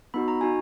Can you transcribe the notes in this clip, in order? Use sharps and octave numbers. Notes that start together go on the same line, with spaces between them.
B3 D#4 F#4 B5
A#5
D#4 F#4 G#5